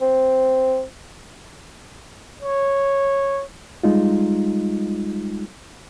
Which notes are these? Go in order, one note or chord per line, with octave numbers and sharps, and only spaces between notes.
C4
C#5
G3 G#3 D#4 F4